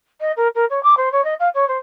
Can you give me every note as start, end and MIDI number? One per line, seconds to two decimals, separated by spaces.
0.21 0.32 75
0.37 0.48 70
0.55 0.65 70
0.70 0.82 73
0.83 0.94 86
0.97 1.12 72
1.12 1.24 73
1.24 1.34 75
1.39 1.49 77
1.54 1.67 73
1.68 1.78 72